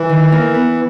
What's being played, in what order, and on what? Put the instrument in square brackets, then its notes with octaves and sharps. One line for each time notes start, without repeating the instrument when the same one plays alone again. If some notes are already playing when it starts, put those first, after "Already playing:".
Already playing: [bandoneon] E3
[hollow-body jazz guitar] D#3
A#3
B3